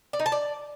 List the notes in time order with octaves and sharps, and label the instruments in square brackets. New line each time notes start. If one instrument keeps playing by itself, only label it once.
[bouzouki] D5
D#4
A5
D5